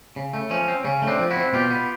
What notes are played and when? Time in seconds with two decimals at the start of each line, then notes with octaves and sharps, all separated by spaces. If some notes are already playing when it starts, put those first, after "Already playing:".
0.16 C#3
0.34 A3
0.50 F3 C#4
0.68 C4
0.85 C#3 C#4
1.02 A3
1.07 C4 D4
1.19 F3
1.31 E4 F#4
1.37 C4
1.53 B2 F4 G4
1.70 B3